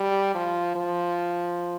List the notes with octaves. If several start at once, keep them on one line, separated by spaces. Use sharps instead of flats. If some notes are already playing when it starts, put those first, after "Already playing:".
Already playing: G3
F3
F3